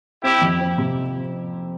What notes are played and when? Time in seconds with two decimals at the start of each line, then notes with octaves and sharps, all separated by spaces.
0.23 C4 E4 G4
0.42 F2
0.60 C4
0.78 C3